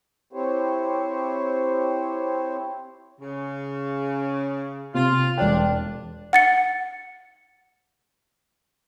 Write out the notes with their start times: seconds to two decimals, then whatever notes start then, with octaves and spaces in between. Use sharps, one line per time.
0.33 C4 E4 G4 C5 C#5
3.20 C#3
4.94 C3 F4
5.37 E1 D4 D5 G5
6.33 F#5 A6 C#7